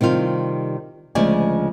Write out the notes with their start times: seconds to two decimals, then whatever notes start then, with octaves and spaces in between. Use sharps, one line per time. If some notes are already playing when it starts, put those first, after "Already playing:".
0.01 C3 D#3 G3 F4
1.15 D2 C#3 F3 G#3 D5 G#5